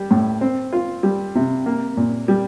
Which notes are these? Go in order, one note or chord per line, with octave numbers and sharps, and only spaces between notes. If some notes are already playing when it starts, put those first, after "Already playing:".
Already playing: G3
A2
C4
F4
G3
C3
A#3
A#2
G3